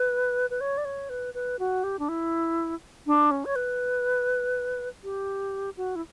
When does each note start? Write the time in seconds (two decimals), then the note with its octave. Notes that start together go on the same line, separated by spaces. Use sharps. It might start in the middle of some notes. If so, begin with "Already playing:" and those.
Already playing: B4
0.50 B4
0.61 C#5
0.77 D5
0.85 C#5
1.10 B4
1.34 B4
1.59 F#4
1.84 G4
1.99 D4
2.09 E4
3.06 D4
3.31 C#4
3.45 C#5
3.56 B4
5.04 G4
5.77 F#4
5.96 E4